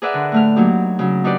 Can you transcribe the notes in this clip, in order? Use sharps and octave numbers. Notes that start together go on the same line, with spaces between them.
G#4 A#4 B4 D5 E5 F#5
D3
A2 A3 F6
F#3 A#3 D#4 G4
C#3 F#3
D4 D#4 F#4 G4 B4 D5